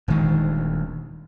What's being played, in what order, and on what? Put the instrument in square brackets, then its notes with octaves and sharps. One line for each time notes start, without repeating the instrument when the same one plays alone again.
[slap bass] D#1 D2 D#3 G#3